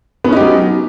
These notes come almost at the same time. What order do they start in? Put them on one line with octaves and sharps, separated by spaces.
B3 C#4 D#4 G4 F#3